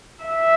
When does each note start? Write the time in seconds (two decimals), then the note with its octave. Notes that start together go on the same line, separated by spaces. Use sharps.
0.23 E5